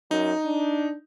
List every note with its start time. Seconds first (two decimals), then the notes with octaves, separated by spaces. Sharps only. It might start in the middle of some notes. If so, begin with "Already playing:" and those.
0.11 F#2 D#4
0.46 D4